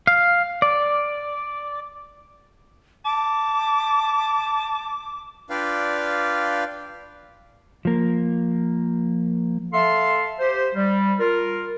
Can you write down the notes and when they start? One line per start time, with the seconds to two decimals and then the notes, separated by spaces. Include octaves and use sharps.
0.07 F5
0.62 D5
3.05 A5 D6
5.50 D4 F4 B4 D5 F5 G5
7.85 F3 A#3
9.74 A4 E5 F5 A5 C6
10.40 G4 C5
10.75 G3
11.20 F4 A#4